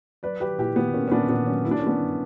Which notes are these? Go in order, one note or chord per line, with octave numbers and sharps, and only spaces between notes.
F#3 B4 D5
F#3 G4 B4
A#2 E4 G4
A#2 B3
A#3 C#4
C#4
A#2 B3 D4
A#2 B3
F#3 C#4
A#3 E4
D4
C#4
A#3 B3 D4
G2